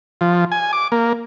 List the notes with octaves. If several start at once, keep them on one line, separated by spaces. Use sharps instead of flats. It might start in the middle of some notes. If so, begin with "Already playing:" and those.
F3
G#5
D6
A#3